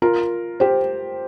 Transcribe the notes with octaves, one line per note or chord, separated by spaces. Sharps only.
F4 A#4
G4 C5